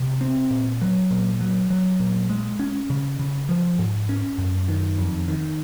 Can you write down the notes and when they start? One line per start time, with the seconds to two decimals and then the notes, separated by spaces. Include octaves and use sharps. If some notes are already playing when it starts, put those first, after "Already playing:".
Already playing: C3
0.21 C4
0.51 A#2
0.81 F#3
1.11 A#2
1.41 F#3
1.70 F#3
2.00 A#2
2.29 G#3
2.59 C#4
2.90 C#3
3.19 C#3
3.49 F3
3.79 G#2
4.09 C#4
4.38 F#2
4.68 D#3
4.98 F2
5.28 D#3